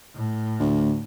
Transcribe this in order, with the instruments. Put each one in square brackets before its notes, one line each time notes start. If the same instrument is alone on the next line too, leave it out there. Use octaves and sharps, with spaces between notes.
[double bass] A2
[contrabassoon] D2